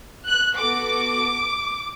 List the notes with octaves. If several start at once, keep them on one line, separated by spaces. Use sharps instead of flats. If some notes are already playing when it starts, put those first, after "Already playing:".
F#6
B3 F#4 A4 D6